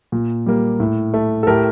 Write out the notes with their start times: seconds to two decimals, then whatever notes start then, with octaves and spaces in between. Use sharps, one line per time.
0.12 A#2
0.46 G3 A#3
0.80 A2
1.14 A3
1.43 A4
1.47 A2 G4 A#4